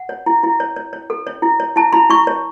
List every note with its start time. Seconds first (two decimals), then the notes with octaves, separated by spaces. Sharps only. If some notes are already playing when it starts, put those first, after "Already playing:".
Already playing: F#5
0.09 C#5
0.26 E4
0.43 E4
0.60 C#5
0.76 C#5
0.93 C#5
1.10 A4
1.27 C#5
1.42 E4
1.60 C#5
1.76 E4 A5
1.93 E4 B5
2.09 E4 C#6
2.27 C#5